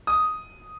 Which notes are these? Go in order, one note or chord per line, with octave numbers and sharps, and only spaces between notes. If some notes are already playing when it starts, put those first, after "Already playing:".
D#6